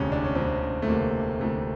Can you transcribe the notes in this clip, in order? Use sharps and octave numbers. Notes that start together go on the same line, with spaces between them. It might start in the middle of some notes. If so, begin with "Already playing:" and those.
Already playing: E1 D2 C3 C#4
D4
C#4
E1 D2 C3 C4
A3
E1 D2 C3 A#3
E1 D2 C3 A3